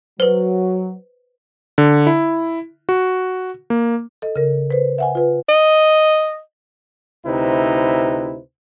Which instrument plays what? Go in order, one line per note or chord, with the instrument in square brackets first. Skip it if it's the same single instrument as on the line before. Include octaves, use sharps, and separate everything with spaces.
[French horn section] F#3 [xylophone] B4 C5
[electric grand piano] D3
E4
F#4
A#3
[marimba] A4 D#5
C#3 A#4
B4 C5
E5 F#5 G#5
F4 B4
[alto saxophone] D#5
[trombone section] D2 C3 D#4 E4 B4 C5